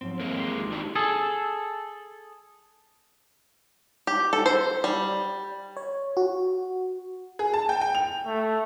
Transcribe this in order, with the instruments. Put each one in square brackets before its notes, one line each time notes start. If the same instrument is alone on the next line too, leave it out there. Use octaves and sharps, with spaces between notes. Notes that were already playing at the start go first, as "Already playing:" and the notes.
[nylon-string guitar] G#2 F3 C#5 [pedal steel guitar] C4
[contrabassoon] F2 [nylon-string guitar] E3 [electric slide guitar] G#3 A#3
[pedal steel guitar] G4 C6
[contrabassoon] G#1
[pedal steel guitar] E3 C#5 [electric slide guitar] D4 D#4 G4
[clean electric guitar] G#4 A4
[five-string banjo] G4
A4
C5
G3
[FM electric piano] C#5
F#4
[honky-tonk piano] G#4
A5
G5
G5
F7
[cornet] A3